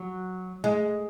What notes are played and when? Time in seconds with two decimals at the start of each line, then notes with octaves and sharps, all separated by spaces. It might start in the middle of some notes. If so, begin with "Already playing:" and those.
Already playing: F#3
0.64 G#3